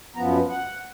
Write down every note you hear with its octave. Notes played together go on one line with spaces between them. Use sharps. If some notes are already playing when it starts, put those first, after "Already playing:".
F#2 F3 B3 A#5
F#5